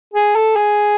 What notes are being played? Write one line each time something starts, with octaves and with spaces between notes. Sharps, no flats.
G#4
A4
G#4